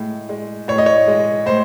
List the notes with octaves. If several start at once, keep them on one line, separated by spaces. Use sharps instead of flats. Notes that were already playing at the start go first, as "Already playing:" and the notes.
Already playing: A2 G#3
G#3
A2 C#5
D#5
C#5
G#3
A2 C5